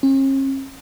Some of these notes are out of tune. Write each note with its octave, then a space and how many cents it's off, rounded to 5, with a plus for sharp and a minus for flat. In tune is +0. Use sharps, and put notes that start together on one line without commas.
C#4 -45